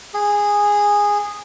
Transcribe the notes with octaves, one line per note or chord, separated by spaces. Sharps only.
G#4